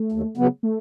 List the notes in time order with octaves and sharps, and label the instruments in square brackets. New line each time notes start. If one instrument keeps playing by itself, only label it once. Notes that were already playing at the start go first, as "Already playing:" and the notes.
Already playing: [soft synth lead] A3
[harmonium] D#2
C#3 F#3 B3
[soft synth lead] A3